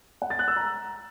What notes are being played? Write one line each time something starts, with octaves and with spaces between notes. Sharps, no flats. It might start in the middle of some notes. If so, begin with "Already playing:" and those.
F#5
A6
F#6
E6
A#5